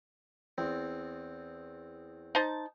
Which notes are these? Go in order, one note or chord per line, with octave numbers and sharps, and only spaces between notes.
E2 C4
D#4 C5 A5